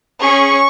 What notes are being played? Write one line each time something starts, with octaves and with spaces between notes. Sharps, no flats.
C#4 G#4 C#6